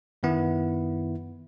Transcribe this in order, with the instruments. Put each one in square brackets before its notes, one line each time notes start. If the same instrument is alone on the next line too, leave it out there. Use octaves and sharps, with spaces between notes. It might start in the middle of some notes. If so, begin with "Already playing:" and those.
[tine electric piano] F#2 D#3 B3 E4